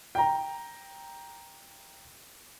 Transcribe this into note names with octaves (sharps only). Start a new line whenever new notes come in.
G5 A#5